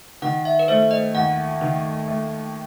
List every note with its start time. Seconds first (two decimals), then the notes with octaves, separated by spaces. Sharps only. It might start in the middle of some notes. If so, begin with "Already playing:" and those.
0.22 D#3 F#5
0.45 E5
0.59 B4
0.68 A3 C5
0.91 D#5
1.15 D#2 F#5
1.61 D#3
2.08 A3